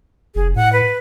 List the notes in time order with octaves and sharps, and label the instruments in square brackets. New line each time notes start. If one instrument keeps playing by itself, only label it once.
[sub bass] F1 [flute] G#4
[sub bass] A2 [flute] F#5
[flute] B4